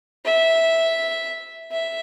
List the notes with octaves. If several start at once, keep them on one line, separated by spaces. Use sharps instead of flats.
E5
E5